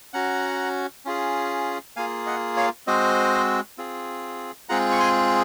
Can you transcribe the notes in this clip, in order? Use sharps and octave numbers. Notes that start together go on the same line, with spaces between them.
C#4 F#4 F#5 A#5
C#4 F4 G#4
A#3 F4 G#4 F5 G#5
D#5 F#5
C#5 F5
G#3 C4 F#4 C5 D#5
C4 F4 G#4
G#3 C4 F4 G#4 F#5 A#5
C#6
G#5 C6